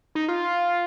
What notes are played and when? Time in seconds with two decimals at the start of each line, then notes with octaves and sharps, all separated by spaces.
0.15 D#4
0.28 F4